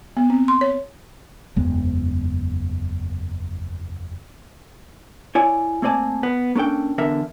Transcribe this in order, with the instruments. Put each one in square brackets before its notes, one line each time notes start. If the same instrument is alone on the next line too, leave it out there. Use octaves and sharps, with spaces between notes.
[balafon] B3
C4
C6
C#5
[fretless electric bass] F#1 E2 G#3 B3
[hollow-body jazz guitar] E4 C#5 D5 G#5
A3 A#3 C4 D5 G#5 A5
B3 B4
A#3 C#4 D4 A4 G5
E2 D3 D4 A#4 E5